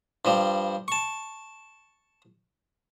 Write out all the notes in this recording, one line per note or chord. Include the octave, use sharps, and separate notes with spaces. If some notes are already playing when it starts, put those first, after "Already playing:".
G2 F3 G3
A5 C#6